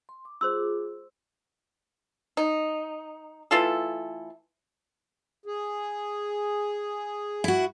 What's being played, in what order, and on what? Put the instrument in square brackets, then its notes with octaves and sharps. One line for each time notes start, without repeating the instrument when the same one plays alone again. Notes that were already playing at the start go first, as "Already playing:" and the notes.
[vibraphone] C6
D6
[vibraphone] F4 G#4 D6 [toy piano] C5 C6 E6
[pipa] D#4
E3 A3 F4 A4
[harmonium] G#4
[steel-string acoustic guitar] E4 F#4